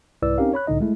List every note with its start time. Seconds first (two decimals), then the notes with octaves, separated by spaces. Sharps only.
0.22 C2 G#2 E4 B4 D5 E6
0.38 C4 C#4 D#4 G4 A#4 F5
0.53 C#5 B5 F#6
0.67 C2 A2 D3 D#4 D#5
0.80 G#3 A3 E4